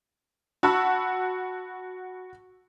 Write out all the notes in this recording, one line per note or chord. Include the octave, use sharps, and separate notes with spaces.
F#4 F#5 A5 B5 C#6 E6